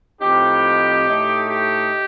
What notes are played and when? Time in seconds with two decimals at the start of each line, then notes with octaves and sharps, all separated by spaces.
0.21 A2 F3 C4 D#4 G4
1.07 A2 A3 D#4
1.49 G4